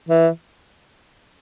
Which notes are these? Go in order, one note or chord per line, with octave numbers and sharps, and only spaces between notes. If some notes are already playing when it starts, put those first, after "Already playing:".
E3